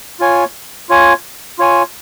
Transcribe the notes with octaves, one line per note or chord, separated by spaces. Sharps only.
F4 C#5 G#5
F4 C#5 G#5
F4 C#5 G#5